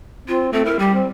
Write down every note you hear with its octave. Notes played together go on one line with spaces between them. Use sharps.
C4 F4
A3 C4
E4 A#4
G3 G4
C4